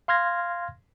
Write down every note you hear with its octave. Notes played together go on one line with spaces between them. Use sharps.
F5 C6 F6 G#6 A#6